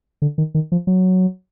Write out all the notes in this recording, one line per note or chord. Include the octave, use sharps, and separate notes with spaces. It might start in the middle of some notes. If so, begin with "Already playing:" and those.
D3
D#3
D#3
F3
F#3